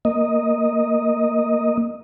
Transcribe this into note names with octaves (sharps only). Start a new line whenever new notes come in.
A#3 D#5